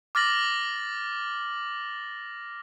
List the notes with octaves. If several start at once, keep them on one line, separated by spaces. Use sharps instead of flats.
D6 F6 A6 A#6 F#7